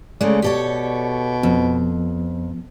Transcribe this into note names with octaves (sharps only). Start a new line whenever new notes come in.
C#3 G#3 A3 D5
B2 G4 A4 C#5
F2 F3 B3